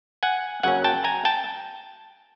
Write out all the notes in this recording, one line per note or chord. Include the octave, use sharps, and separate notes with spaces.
F#5 G#5
F#2 C#3 F#3 A#3 C#4 F#5 G#5
G5 A5
G#5 A#5
G5 A5